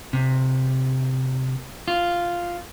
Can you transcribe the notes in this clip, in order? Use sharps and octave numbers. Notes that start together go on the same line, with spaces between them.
C3
F4